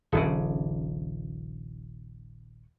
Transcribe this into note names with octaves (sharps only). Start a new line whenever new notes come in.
D#1 A#1 C#3